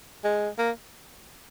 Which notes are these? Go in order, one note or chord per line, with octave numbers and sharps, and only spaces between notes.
G#3
A#3